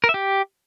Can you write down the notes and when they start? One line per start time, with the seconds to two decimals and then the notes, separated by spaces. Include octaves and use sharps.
0.04 A#4
0.09 E5
0.14 G4